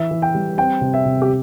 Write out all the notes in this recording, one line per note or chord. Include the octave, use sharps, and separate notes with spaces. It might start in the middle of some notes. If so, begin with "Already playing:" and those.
Already playing: E3 E5
E3
G5
G3
C4 G5
C3
E5
C3
G4